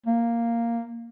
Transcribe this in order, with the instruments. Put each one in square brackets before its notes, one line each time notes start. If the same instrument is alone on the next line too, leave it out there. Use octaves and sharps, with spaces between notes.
[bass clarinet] A#3